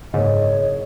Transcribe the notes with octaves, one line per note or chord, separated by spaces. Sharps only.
F#1 G#2 C#5 D#5